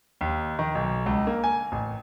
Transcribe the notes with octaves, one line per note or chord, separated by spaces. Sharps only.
D#2
D#3
B1
C#2
A#3
G#5
A1